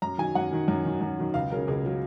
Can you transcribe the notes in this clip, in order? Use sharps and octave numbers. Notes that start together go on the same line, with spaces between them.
F#2 A#5
D#3 F#3 G#5
F#2 F#5
D#3 F#3
F#2
D#3 F#3
F#2
D#3 F#3
C#2 F5
C#3 F#3 A#4
C#2 G#4
C#3 F#3